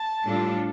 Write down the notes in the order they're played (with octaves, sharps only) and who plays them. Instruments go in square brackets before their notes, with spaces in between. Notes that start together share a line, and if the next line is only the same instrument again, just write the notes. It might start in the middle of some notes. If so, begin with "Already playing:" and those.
Already playing: [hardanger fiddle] A5
[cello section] A2 G3 D4 F4 A4